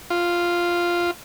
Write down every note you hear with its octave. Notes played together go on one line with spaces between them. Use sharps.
F4